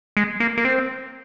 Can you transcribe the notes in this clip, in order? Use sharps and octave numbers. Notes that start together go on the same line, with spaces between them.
G#3
A#3
A#3
C4